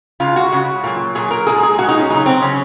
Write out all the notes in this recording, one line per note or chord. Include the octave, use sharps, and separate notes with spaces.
C#3 G#3 F4
F#4
C#3 G#3 F#4
A#2 F#3
A#2 F#3 G#4
A#4
A#2 G#3 G#4
G#4
A#2 G#3 F#4
D#4
C#4
C#3 F#3 D#4
C4
C#3 F#3 C#4